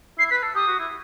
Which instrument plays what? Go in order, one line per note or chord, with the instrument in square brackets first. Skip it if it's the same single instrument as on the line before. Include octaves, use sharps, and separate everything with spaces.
[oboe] E4 [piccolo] C7
[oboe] B4 [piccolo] B6
[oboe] A4
[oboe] G4 [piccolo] D#6
[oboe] F#4
E4